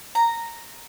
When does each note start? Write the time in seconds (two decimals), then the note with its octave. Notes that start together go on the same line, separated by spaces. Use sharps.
0.15 A#5